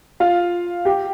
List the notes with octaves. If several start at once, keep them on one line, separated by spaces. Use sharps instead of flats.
F4 F5
G4 G5